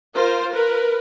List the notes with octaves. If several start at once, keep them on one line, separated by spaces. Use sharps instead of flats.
F4 A#4 C5
A#4 B4